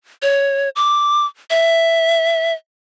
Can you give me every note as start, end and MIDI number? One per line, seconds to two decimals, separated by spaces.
0.22 0.69 73
0.76 1.25 86
1.50 2.53 76